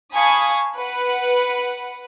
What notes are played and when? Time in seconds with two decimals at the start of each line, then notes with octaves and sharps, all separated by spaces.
0.13 F5 G#5 A5 B5 C#6 D#6
0.75 B4 F#5